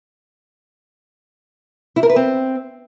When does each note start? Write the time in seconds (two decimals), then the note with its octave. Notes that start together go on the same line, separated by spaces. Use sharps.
1.96 E4
2.03 A#4
2.10 B4
2.16 C4